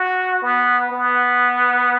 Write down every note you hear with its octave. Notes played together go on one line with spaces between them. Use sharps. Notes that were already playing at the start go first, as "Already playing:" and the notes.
Already playing: F#4
B3
B3